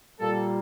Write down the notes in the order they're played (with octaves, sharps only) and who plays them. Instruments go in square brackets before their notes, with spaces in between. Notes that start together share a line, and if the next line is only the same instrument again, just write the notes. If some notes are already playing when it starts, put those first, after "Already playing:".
[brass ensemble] A#2 G3 A#3 A4